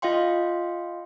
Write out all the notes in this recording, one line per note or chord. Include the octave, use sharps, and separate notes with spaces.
F4 D#5 F5 G5 C6